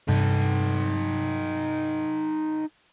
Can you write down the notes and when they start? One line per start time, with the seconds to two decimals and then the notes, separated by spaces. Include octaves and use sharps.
0.09 G2 C3 D#4 A4